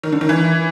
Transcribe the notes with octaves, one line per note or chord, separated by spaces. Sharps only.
D#3
D3
D#3
E3